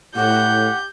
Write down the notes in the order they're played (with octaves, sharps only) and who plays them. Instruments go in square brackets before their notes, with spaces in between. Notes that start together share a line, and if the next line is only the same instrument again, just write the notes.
[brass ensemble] A2 [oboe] G4 [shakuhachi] F#5 [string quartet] G6